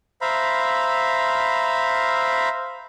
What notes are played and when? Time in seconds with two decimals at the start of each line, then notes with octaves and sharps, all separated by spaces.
0.22 C5 E5 F5 A#5 B5